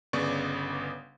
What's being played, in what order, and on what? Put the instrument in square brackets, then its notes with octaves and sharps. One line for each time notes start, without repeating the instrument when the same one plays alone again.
[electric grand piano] G1 C#3 B3 D5 C#6 D6